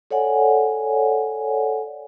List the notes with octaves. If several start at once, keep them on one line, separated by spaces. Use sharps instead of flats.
A4 C#5 D5 F#5 G#5